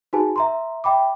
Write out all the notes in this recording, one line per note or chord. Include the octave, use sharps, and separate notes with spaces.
D#4 F#4 G#4 B4 G#5 A5
E5 A#5 C6
E5 G5 B5 D6